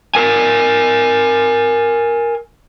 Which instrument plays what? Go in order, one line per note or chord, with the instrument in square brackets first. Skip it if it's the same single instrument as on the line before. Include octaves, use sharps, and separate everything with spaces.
[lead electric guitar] A#4 G#5